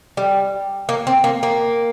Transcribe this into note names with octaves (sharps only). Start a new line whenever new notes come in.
G3
A#3
C4
A#3
A#3